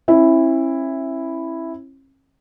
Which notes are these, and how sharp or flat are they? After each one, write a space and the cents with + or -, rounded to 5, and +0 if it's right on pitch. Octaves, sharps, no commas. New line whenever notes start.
C#4 -40 E4 +0